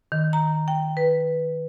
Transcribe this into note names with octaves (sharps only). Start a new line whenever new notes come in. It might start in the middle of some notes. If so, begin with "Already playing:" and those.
D#3
A#5
G5
B4